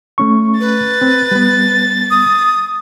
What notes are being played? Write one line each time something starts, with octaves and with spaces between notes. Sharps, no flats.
A3 C#4 C#6
B4 A6
C4
G3 B3
D#6